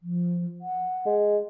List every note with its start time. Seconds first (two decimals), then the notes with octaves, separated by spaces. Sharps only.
0.03 F3
0.61 F#5
1.06 G#3